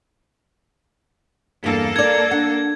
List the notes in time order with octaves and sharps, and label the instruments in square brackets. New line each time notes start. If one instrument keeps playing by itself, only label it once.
[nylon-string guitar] E2 G2 [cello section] A#3 A4
[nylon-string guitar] A#4 D5 [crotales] G#6
[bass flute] D4 [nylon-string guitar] F#5